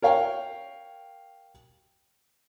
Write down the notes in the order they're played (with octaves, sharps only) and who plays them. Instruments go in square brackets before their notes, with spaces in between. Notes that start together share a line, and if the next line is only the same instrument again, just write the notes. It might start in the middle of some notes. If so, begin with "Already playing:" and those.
[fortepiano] A#4 C#5 F5 G5